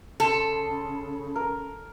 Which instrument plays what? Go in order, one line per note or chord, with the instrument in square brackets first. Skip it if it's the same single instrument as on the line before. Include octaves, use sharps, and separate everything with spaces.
[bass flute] C#3 [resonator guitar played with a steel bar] A4 [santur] A5 C6
[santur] A#4